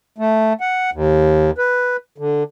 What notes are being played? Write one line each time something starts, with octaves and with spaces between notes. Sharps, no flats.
A3
F#5
D#2
B4
D3